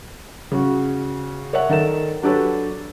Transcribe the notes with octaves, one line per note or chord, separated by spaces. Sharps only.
C#3 F#4
A#4 C#5 D5 E5 F#5
D#3 A4 A#4 E7
F#3 D4 G4 A4 B4 C#5